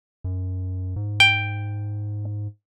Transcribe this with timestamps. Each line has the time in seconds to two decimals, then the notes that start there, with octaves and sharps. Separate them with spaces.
0.24 F#2
0.96 G#2
1.20 G5